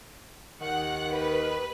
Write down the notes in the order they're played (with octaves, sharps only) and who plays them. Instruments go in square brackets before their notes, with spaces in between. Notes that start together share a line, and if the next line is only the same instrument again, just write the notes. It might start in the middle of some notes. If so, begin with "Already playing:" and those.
[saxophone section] D#2 D#3 [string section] F#5
[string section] B4